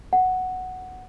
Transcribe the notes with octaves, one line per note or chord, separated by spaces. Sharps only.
F#5